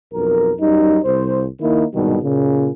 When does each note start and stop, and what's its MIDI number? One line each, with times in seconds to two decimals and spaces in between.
0.13 0.52 35
0.13 0.52 41
0.13 0.52 70
0.59 0.98 42
0.59 0.98 55
0.59 0.98 63
1.04 1.45 36
1.04 1.45 72
1.60 1.84 51
1.60 1.84 58
1.60 1.84 63
1.60 1.84 64
1.93 2.17 36
1.93 2.17 44
1.93 2.17 47
1.93 2.17 51
1.93 2.17 55
2.22 2.69 46
2.22 2.69 49